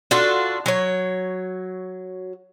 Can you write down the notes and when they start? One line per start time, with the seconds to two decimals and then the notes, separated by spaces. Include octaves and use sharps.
0.11 D4 F4 F#4 A4
0.66 F#3 C#5